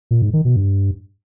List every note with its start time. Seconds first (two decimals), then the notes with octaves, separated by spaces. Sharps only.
0.11 A#2
0.22 G#2
0.33 D#3
0.45 B2
0.56 G2